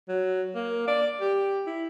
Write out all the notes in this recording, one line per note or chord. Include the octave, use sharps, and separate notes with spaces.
F#3
A#3
D5
G4
E4